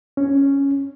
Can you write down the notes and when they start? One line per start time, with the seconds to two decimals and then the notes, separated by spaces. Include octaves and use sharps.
0.17 C#4